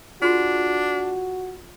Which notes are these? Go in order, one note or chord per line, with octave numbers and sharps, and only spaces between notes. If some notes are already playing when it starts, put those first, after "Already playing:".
D4 F4 F#4 G#4 C6